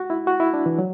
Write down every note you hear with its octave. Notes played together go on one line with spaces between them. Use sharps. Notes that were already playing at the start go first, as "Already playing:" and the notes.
Already playing: F#4
E4
F#4
E4
D4
E3
F#3